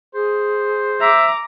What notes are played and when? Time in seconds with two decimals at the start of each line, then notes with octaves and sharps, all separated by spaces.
0.14 G#4 C5
1.01 E5 A#5 D6